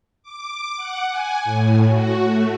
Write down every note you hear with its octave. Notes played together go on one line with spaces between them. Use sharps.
D6
F#5
G#5
A2
F#4
A3